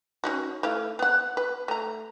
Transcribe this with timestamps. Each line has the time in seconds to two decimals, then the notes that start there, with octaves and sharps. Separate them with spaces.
0.24 C#4 D#4 F#4
0.63 A3 E4 F5
0.99 B3 F#5
1.37 B4
1.68 A3 A#5